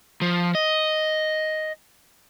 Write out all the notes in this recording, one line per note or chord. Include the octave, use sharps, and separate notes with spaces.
F3
D#5